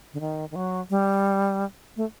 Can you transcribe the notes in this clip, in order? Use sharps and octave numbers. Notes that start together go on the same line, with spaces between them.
D3
D#3
D#3
F#3
G3
A3